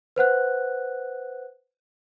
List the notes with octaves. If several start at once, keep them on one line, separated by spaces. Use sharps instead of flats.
B4 C5 F#5 F#6